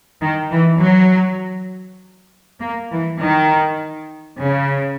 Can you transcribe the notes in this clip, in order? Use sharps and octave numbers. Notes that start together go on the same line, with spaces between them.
D#3
E3
F#3
A#3
E3
D#3
C#3